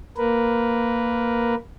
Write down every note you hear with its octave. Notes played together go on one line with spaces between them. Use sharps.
A#3 A#4 B4